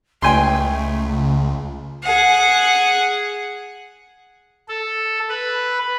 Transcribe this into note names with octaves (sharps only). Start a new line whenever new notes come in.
C#2 A3 G5 G#5 C6
G#4 F#5
A4
B4